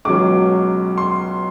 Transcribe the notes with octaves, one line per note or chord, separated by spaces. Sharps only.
C#2 B2 F#3 D6
C6